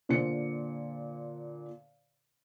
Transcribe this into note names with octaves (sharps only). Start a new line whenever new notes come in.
A#2 D3 C5 C#7